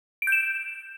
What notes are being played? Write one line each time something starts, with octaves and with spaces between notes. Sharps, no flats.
D7
G6
E7